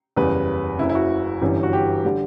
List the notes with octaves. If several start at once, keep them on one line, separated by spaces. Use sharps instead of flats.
F#1 E2 C#3 G3 B4
F#1 F#2 C#3 E4
E4
F#4
G1 F#2 E3 G3
F#4
G4
D3 G3